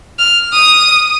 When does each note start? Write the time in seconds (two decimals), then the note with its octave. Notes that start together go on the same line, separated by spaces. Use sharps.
0.19 F6
0.53 D#6